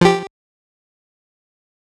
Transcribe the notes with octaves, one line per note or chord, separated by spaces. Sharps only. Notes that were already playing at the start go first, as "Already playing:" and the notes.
F3 G4